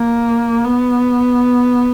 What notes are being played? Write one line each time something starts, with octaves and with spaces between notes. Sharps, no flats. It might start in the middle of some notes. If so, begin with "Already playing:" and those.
Already playing: A#3
B3